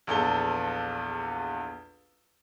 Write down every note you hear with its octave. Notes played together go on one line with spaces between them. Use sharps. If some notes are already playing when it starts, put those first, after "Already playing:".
A#1 E2 A4 G7